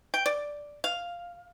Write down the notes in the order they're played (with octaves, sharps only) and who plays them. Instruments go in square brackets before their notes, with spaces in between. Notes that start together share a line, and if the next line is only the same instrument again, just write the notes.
[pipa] G5
D5
F5